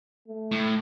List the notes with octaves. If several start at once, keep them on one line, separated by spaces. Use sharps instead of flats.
A3
A2